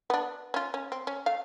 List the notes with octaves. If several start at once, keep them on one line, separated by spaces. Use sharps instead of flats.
B3 D4
C#4 F4
C#4
C4
C#4
A3 F5